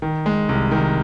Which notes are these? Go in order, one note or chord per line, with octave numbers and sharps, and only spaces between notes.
D#3
G#3
C2
D#3